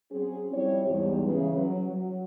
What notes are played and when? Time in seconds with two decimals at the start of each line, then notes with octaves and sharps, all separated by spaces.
0.11 F#3 C4 C#4 G#4
0.53 F3 G3 C4 E4 C#5
0.86 E2 G#2 G3
1.25 C#3 E3
1.56 F#3
1.87 F#3